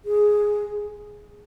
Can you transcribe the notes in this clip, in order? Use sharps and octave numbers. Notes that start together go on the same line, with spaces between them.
G#4